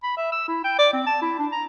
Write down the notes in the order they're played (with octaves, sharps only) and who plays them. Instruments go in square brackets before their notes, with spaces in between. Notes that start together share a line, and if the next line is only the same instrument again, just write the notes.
[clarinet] B5
E5
E6
E4
G5
D5
C4
A5
E4
D4
A#5